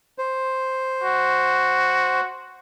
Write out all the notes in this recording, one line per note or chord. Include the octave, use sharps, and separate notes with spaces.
C5
F#4